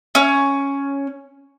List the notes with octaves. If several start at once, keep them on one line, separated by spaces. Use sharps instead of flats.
C#4